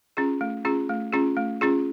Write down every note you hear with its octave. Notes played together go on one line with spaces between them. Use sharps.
C#4 F4 G#4
A3
C#4 F4 G#4
A3
C#4 F4 G#4
A3
C#4 F4 G#4